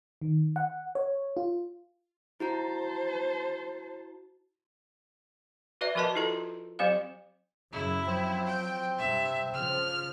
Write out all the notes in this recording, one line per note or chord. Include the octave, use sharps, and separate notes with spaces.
D#3
F#5
C#5
F4
E4 F#4 C5 A5 A#5
F#4 B4 D5 E5
F3 F#4 A#4 B4 D#5 A5
E4 F4 A4 A#5
F#3 C4 G4 C5 F5
F#2 C#3 F#3 E4
F3 F#3 C4
G5
G2 C3 E5
C#3 F3 F6